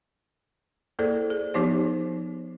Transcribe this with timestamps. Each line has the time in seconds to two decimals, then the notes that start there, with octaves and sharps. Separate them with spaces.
0.99 A#3 E4 G#4 A4 C5 D5
1.30 G#4
1.54 F3 B3 D#4 G4 C5